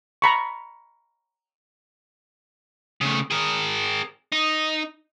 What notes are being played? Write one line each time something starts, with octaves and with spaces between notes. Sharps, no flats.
A#5 B5 C#6
C#3 A3
G#4 A#4
D#4